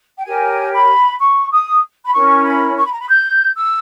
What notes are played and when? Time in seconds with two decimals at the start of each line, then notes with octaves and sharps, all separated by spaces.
0.17 G5
0.25 G4 A#4 C#5 G#5
0.73 B5
1.20 C#6
1.51 D#6
2.05 B5
2.13 C#4 E4 A#4 C#5 C#6
2.45 B5
2.76 C#6
2.85 B5
2.92 A#5
2.99 B5
3.09 G6
3.55 E6